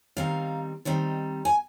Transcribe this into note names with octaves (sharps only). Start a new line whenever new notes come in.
D#3 G3 C4 D#4 F5
D#3 G3 C4 D#4
G#5